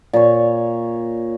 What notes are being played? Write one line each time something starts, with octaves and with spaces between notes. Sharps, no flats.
A#2 C#5